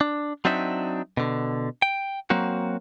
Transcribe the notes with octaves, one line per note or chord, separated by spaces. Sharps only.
D4
F#3 C4 D4 D#4 E5
B2 D3
G5
F#3 A#3 C4 F#4